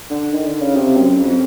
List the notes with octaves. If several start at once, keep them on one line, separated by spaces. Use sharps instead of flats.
D3
D#3
D3
C#3
C3
F#2
F2